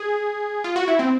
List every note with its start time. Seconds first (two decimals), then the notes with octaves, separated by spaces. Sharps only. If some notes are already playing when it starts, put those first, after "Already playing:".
Already playing: G#4
0.64 F4
0.76 F#4
0.88 E4
0.99 C4